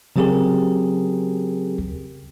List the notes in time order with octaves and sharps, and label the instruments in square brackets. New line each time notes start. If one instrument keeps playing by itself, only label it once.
[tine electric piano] C#3 F#3 C4 G4 G#4 A#4